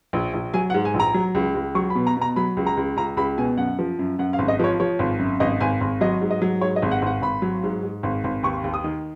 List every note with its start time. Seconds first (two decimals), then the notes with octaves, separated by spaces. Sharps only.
0.13 A#1
0.33 A#1
0.54 F#3 G#5
0.70 F#5
0.74 G#2
0.85 G#5
0.94 A#1
1.00 A#5
1.14 F#3
1.35 C#2
1.55 C#2
1.75 F#3 C#6
1.90 B5
1.95 B2
2.07 A#5
2.17 B2 A#5
2.36 F#3 B5
2.57 C#2
2.67 A#5
2.77 C#2
2.96 C#2 A#5
3.17 C#2 B5
3.38 B2 G#5
3.57 F#2 F#5
3.79 F3
3.99 F#2
4.19 F#2 F#5
4.33 F5
4.39 G#1
4.48 D#5
4.59 F3 C#5
4.80 F3 C#5
4.99 G#1
5.19 F#2
5.40 G#1 D#5
5.60 G#1 G#5
5.81 G#1
6.01 F#3 D#5
6.21 G#2
6.31 D#5
6.42 F#3
6.61 G#2 C#5
6.76 D#5
6.82 G#1
6.91 F#5
7.02 G#1 F#5
7.22 G#1 B5
7.42 F#3
7.63 G#2
7.83 G#2
8.03 G#1
8.24 G#1
8.43 D#2 C#6
8.64 D#2
8.74 D#6
8.84 D#3